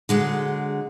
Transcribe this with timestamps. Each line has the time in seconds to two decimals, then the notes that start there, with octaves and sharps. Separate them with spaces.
0.09 D3 F#3 G#3